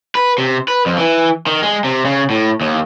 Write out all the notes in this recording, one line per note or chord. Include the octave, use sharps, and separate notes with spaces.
B4
C3
B4
F2
E3
D#3
G#3
C3
C#3
A2
D#2